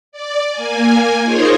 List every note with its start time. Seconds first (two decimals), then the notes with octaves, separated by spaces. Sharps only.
0.12 D5
0.52 A#3 G#5
1.22 D#4 F4 G#4 A#4 C5 C#5